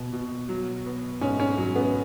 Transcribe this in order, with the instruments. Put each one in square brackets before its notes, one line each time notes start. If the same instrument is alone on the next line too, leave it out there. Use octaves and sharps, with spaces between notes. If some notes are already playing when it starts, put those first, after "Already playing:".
Already playing: [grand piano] B2
B2
F#3
B3
[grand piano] G#2 [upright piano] C#4
[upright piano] C#4
[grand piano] F#3
[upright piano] B3